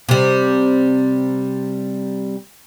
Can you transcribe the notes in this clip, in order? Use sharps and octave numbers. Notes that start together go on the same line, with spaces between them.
C3 G3